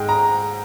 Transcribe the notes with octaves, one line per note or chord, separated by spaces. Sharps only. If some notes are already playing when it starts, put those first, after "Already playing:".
Already playing: G#2 G#3 G5
A#5